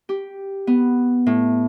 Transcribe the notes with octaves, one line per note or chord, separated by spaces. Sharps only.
G4
B3
A2